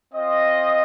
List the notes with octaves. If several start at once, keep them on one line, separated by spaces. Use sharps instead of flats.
C4 F4 D#5